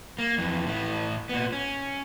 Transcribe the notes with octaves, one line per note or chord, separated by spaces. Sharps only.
A#3
F2 E3
A2 E3
A#2 B3
C#4